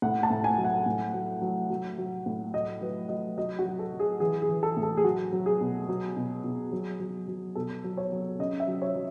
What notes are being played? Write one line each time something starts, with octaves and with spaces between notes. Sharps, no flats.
A2 F#5
A5
A2
G#5
F#3
F#5
A2
F#3
F#3
F#3
F#3
A2
F#3 D#5
F#3 B4
F#3 D#5
F#3 D#5
F#4
F#3
A4
F#3
G#4
E3 G#4
G#4
E3
A4
A2
A4
G#4
F#3 F#4
F#3
G#4
B2
F#3
B2
B2
F#3
F#3
F#3
B2 A4
F#3
C#5
F#3
C#3 D#5
E5
F#3
C#5
F#3